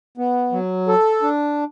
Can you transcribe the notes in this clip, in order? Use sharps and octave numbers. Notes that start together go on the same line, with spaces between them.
B3
F#3
A4
D4